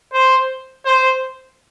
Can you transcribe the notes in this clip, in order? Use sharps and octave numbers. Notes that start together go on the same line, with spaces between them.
C5
C5